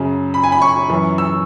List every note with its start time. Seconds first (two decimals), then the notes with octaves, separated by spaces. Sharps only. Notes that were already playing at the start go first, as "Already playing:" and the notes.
Already playing: F#2 C#3 F#3
0.34 B5
0.44 G#5
0.52 B5
0.62 C#6
0.89 F#2 E3
1.18 E6